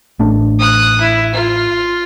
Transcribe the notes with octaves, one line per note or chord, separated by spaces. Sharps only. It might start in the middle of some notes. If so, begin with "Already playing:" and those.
A1 A3 D4
D#6 F#6
E4
F4